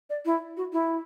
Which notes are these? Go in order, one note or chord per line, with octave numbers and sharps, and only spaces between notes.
D5
E4
F#4
E4